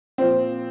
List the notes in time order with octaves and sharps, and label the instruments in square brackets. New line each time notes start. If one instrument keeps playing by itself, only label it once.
[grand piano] A#2 F3 C4